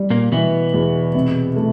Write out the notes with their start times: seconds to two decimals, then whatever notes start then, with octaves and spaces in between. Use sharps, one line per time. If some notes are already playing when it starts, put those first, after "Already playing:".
Already playing: G3
0.10 A#2 A#3
0.32 B2 E3 B3
0.74 E2
1.15 C3
1.56 A3